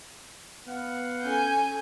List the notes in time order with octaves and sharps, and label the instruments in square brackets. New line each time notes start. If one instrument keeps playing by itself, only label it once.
[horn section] B3 F5 F#5
[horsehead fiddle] C#4 A4 [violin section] G#5 G6